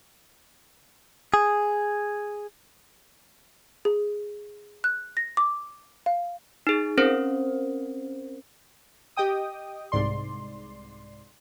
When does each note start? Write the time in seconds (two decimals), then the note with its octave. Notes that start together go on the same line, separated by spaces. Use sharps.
1.34 G#4
3.85 G#4
4.84 F#6
5.17 A#6
5.37 D6
6.06 F5
6.67 D#4 G#4
6.98 C4 C#4 A#4 C5
9.17 G4 D#5 G5 D#6
9.92 C2 G#2 D5 C6